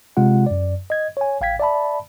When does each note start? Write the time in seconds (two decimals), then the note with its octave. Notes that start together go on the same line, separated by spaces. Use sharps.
0.17 C3 G#3 F4 F#5
0.46 F#2 D5
0.90 D#5 G#6
1.17 C#5 G#5
1.41 A1 F5 G5 G#6 B6
1.60 D5 E5 A5 B5